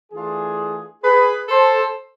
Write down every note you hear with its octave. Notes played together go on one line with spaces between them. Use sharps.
E3 A3 D4 F4 G#4
G#4 B4
A4 C5